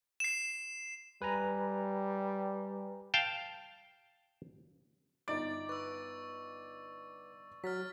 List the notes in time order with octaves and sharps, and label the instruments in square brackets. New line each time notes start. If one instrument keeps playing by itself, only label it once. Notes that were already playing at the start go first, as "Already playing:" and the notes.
[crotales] C7 E7
[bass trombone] G3 [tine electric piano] B4 G#5 A#5
[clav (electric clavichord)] F5 G5 A5
[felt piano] G1 D#4 D7 [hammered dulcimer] D5 [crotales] A6
[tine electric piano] B4 [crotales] C#6 E6
[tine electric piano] F#3 [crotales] F6 A6 B6